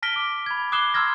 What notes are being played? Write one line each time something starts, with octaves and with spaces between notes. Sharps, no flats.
A5 F6 A#6 B6 D7 G7
D6
B5 G#6
D6 D#6 F#6 C7 E7 G7
A#5 C6 E6 F6 G#6 A#6